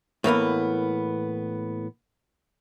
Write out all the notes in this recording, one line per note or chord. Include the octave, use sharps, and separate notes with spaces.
A2 E3 A#3 B3